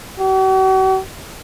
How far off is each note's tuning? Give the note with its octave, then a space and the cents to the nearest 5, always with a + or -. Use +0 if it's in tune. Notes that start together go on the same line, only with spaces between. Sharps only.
F#4 +45